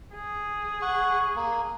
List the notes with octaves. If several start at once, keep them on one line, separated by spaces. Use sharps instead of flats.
G#4
F#5 C#6
A#3